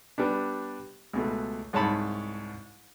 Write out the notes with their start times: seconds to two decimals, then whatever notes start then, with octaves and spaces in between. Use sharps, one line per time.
0.18 G3 B3 D4
1.13 C#2 B2 A3
1.73 C2 G#2 C#5 A5 B5